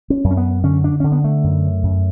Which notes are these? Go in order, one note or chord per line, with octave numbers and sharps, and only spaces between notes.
C#4
F#2
C#4
B3
D3 C#4
D4
D3 C#4
B3
A3
F#2
F#2